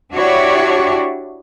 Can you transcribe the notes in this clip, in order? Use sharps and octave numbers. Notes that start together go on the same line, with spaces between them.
D4 E4 F#4 G4 C#5 D5